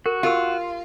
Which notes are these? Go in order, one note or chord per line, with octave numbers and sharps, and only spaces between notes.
F#4 A#4
F4 G4 A#4 E6